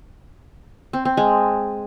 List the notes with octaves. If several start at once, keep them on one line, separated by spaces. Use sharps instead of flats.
C4
C4
G#3